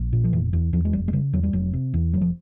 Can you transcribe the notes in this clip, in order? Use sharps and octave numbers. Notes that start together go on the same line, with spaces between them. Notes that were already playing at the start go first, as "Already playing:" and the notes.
Already playing: A#1
A#2
F3
F1 E3
E2
E2 F3
G#3
F1 G3
G#3
C#3 G3
E2 F#3
G3
F1 F#3
C3
E2
F1 F#3
F3